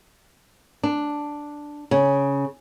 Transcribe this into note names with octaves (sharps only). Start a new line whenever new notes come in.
D4
C#3